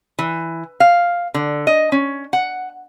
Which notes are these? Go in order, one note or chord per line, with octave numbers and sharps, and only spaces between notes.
E3
F5
D3
D#5
C#4
F#5